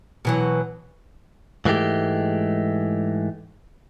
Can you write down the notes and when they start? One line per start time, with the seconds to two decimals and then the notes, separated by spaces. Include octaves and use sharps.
0.25 B2 E3 F#3
1.65 G#2 E3 G#3 A3 G4